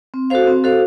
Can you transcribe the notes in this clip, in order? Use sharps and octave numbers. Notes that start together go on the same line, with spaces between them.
C4
F#4 A4 C5 F5
C4
F#4 A4 C5 F5